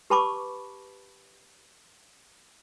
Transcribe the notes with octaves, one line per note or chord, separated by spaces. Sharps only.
G4 B4 A5 B5 C#6 D6